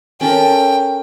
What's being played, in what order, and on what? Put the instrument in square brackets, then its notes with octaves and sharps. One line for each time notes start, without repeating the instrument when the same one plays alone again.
[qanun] C#4 A4 A#4 [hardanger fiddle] G5